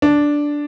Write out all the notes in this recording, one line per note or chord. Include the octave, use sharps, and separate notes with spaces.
D4